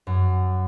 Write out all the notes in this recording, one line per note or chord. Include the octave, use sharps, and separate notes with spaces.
F#2